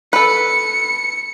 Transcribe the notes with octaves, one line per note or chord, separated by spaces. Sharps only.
A4 B4 C#7